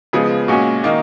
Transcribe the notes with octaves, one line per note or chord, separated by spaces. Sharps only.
C#3 F3 G#3 B3 G#4
A#2 G#3 C#4 F#4
D#3 A#3 D#4